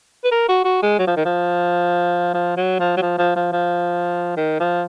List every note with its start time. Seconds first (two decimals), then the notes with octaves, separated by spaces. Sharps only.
0.25 B4
0.32 A#4
0.49 F#4
0.65 F#4
0.83 G#3
0.99 F#3
1.07 F3
1.17 D#3
1.25 F3
2.34 F3
2.57 F#3
2.80 F3
2.97 F#3
3.02 F3
3.18 F3
3.36 F3
3.52 F3
4.37 D#3
4.60 F3